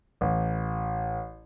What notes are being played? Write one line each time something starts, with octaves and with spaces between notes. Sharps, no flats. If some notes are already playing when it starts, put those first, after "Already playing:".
A1